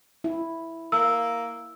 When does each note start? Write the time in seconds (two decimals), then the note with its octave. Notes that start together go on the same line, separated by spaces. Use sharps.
0.24 E4
0.92 A#3 E6